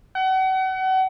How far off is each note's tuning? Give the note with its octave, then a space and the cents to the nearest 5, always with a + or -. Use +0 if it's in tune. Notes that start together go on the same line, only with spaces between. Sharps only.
F#5 +35